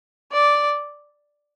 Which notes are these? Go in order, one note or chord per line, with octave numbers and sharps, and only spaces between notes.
D5